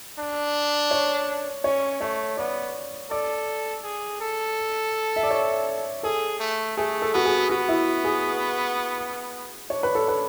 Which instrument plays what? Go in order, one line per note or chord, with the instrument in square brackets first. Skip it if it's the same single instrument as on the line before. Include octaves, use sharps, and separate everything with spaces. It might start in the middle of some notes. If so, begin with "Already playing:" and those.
[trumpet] D4
[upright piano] C#5
[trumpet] C#4 [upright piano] C#5
[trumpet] A3 [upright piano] C#5
[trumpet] B3 [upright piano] D5
[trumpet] A4 [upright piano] D5
[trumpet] G#4
A4
[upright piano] E5
D5
C#5
[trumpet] G#4 [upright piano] A4
[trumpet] A3
[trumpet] A3 [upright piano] G#4
[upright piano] A4
[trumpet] B3 [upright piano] F#4
[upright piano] G#4
[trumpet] B3 [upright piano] F#4
[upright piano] E4
G#4
[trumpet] D4 [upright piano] C#5
[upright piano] B4
A4
B4